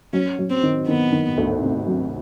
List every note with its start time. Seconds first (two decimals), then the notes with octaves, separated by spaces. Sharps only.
0.13 F#3 C#4
0.39 F#3
0.50 C4
0.63 D#3
0.88 D#3 B3
1.12 D#3
1.37 D2
1.62 C3
1.87 F#3